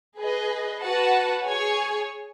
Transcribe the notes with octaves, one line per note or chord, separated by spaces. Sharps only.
G#4 B4 D#5
F#4 B4 F#5 A5
G#4 C#5 G#5